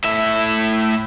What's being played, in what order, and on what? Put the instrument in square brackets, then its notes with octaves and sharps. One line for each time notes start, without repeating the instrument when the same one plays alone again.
[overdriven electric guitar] A2 E5